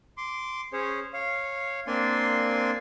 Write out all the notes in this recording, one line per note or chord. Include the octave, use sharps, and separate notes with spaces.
C6 D6
C#4 G#4 C5 C#5
C#5 F5
A#3 C4 D4 D5 G#5 C6